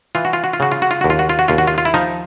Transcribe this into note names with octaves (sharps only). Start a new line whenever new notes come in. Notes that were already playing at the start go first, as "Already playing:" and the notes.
E3 F4
F#4
F4
F#4
F4
C#3 F#4
F4
F#4
F4
D#2 F#4
F4
F#4
F4
F#4
D#2 F4
F#4
F4
F4
E4
F3 D#4